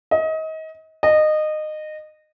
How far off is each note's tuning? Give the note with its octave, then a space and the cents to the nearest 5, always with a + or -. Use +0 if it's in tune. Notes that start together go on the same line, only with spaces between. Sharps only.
D#5 +30
D#5 -20